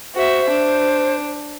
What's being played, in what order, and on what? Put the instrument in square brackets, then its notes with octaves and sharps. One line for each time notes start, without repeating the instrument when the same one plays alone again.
[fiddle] F#4 E5 [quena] C5
[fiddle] D4